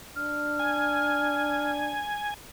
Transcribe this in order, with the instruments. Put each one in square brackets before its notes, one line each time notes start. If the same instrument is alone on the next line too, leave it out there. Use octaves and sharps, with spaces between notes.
[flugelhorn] D4 [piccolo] F6
[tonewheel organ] G#5